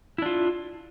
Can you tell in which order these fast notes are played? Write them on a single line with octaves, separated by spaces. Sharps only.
E4 D4 F4